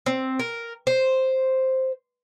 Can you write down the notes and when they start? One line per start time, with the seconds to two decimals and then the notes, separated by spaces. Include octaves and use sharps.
0.06 C4
0.39 A#4
0.87 C5